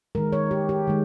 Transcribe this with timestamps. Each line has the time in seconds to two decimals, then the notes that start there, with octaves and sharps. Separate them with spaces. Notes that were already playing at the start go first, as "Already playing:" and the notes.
0.15 D#3 G#3 A#4
0.33 C#5
0.51 G4
0.69 G4
0.87 D#3 G#3